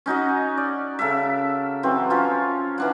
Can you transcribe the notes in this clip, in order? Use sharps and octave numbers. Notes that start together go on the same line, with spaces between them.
C#4 D#4 F#4 D#5
D5
C#3 A4 A#4 E5
E3 F#3 C4
F3 C#4 F4
E3 D4 F#5